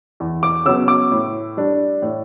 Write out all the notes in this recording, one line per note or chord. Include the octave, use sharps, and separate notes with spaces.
E2
D6
C#3 F#3 B3 E6
D6
A2
G3 D4
A2